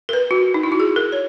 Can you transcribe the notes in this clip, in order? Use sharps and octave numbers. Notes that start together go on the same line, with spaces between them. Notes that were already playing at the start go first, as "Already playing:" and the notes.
A#4
B4
F#4
D#4
E4
F#4
G#4
A#4
C#5